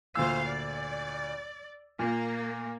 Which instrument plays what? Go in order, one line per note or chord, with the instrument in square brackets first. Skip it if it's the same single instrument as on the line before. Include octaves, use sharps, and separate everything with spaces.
[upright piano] D2 A#2 E6 [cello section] C5 F5
[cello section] D5
[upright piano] A#2 [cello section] A#3